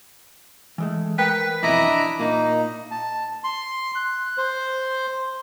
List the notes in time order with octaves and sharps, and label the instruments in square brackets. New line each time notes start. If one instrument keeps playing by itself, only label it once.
[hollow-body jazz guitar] E3 G#3 A3
[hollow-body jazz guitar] A#4 G5 [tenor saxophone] B4
[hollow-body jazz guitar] F2 B2 E3 [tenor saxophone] E4 [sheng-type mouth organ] D#5 A#5 D6
[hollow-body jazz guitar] D4
[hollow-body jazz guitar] A#2 [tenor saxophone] A#3 [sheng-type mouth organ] D#4
[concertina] A5
C6
F#6
C5